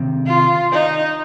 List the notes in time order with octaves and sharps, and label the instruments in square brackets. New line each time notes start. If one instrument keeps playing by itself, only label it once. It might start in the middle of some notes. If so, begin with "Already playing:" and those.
Already playing: [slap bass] C3 D#3 C4
[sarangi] F4
D#4